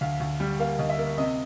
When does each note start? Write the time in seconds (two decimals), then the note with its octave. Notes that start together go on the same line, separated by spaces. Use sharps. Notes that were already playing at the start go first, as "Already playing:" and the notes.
0.01 D2 F5
0.20 D2
0.40 G3
0.60 A#3 F5
0.79 D2 D#5
0.90 E5
0.99 A#3
1.18 C3 D#5